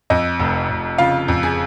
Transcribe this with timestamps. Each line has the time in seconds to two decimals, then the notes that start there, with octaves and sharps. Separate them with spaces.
0.10 F2 D#5
0.40 F1
0.69 F1
0.98 C#3 F4 F5
1.28 F2
1.43 G#4 G#5